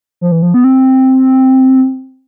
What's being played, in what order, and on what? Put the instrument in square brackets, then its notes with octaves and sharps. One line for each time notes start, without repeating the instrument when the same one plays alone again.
[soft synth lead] F3
E3
F3
B3
C4